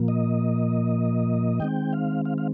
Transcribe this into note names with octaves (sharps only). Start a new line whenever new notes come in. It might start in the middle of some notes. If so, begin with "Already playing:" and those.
Already playing: A#2 F3 A#3
D#5
D#3 G#3 C4 G5
F5
F5
F5